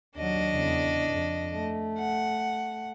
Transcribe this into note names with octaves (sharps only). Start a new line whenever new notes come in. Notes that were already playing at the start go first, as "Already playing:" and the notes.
D#2 F#3 D4 D#5
E2 C#3
F2
A3
F#5